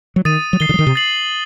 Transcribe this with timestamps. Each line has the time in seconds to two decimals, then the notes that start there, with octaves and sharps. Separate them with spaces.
0.16 F#3
0.25 D#3 D#6 A6 D#7
0.53 F#3
0.60 D#3 A6 C7 G7
0.69 D3
0.74 F#3
0.79 D#3
0.87 C3
0.95 A6 C7 F#7